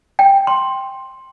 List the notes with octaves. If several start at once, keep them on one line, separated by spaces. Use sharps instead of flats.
G5
C6